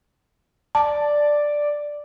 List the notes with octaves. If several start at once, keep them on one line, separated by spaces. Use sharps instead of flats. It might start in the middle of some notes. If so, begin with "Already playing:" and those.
D5 A5